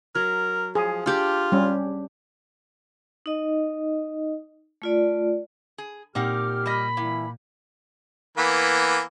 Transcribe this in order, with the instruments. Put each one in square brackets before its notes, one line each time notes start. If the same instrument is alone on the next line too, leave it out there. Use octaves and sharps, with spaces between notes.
[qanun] F#3 [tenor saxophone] A#4
[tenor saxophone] F3 [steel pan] G#4
[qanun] D4 G4 G5 [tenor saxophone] F4
[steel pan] G3 C#4
[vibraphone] D#4 D#5
A3 F4 D5
[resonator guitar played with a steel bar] G#4
[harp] A#2 [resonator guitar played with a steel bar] C4 D#4 F#5 [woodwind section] G4 F6 [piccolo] D6
[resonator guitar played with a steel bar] G3 D#5 [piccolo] B5 [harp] D7
[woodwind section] E3 G3 E4 [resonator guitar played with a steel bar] A#3 [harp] G5
[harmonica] E3 A#3 B3